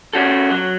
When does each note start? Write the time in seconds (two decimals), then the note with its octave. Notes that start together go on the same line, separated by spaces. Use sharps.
0.13 C#4 F#4 A4
0.50 F#3